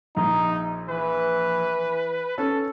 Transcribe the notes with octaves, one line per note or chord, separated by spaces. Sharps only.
A#1 D#4
E3 B4
C#4 A4